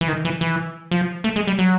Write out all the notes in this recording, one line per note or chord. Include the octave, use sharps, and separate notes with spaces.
E3
D#3
E3
E3
F3
A3
G#3
G3
F#3